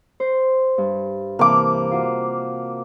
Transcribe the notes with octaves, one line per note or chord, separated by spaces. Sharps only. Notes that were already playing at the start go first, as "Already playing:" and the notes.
C5
G2
C3 E3 A#3 D6
F4 F#4